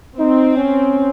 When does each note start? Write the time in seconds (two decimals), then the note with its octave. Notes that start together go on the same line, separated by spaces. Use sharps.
0.19 C4 D#4
0.57 C#4